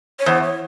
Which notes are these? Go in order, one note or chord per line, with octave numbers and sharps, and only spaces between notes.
C#5
E2 C5
C#5